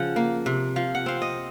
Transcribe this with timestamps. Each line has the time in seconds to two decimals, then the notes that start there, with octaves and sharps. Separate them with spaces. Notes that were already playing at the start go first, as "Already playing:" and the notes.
Already playing: C#3 F3 F#5
0.16 A#3
0.46 C3
0.76 F3 F5
0.95 F#5
1.06 C4 F5
1.22 D#5